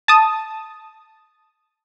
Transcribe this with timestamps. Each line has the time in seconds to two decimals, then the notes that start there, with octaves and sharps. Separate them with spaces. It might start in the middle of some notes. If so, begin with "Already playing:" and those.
0.08 A5 D#6